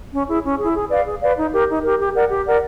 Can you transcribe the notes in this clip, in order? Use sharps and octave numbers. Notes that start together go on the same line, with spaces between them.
C#4
E4 G#4
C#4
E4 G#4
G#4
B4 D5 F5
G#4
B4 D5 F5
D#4
G4 A#4
D#4
G4 A#4
G4
A#4 D5 F#5
G4
A#4 D5 F#5